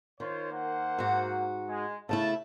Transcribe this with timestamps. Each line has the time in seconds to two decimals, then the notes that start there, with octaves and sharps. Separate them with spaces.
0.20 D#3 F4 C5 C#5
0.51 A#3 C5 F#5
0.98 G#2 F#4
1.69 G#3
2.09 C#3 A3 E4 E5 A5